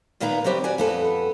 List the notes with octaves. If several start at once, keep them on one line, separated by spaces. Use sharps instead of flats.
A#2 D#3 A#3 B3 B4 A#5
F#3 G3 C4 G4 B4
F#4 D5 G#5
F2 B3 A4